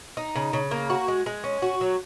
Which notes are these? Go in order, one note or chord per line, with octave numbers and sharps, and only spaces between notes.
D#4
C#3
C#3
A#3
F#4
G#3
G#3
C#4
F#4
F#3